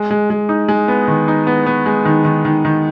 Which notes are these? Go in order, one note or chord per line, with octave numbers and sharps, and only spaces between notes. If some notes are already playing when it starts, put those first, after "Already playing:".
Already playing: G#3
G#3
G#3
D#4
G#3
B3
D#3
D#4
B3
B3
G#3
D#3
D#3
D#3
D#3